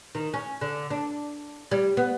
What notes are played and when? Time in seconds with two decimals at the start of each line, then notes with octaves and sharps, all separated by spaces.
0.15 D#3
0.34 C#4
0.61 D3
0.90 D4
1.71 G3
1.97 B3